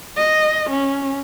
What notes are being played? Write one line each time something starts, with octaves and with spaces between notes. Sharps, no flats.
D#5
C#4